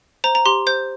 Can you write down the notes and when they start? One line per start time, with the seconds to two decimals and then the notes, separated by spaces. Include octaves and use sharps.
0.24 C5 A#5
0.35 A#5
0.46 G4 C6
0.67 C5 G6